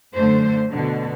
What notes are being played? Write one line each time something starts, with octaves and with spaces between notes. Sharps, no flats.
F#2 D3 A3 C5
B2 D3